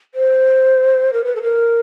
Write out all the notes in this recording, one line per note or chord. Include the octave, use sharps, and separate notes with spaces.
C5
A#4
B4
A4
A#4